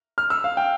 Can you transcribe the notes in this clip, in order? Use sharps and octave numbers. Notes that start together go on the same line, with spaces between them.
F6
E6
F5
G5